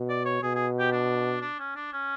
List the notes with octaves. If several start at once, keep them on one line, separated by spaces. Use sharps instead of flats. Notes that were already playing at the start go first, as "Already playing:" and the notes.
Already playing: B2
D5
C#5
B2 G#4
G#4
G4
D4
D4
C#4
D4
C#4